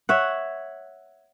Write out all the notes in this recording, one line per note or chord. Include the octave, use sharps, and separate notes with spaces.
C#5 E5 F#5